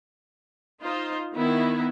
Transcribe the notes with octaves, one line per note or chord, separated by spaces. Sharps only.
D#4 F4 C5
D#3 B3 E4